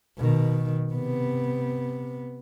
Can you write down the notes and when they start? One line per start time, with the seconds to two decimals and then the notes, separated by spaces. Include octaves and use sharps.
0.18 B2 D#3
0.93 C3 B3